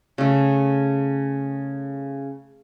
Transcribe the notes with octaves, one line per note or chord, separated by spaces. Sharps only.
C#3 A3